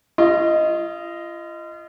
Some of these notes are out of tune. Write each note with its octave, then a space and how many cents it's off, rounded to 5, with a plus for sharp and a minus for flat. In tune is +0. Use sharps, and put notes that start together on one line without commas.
F4 -40 D#5 +0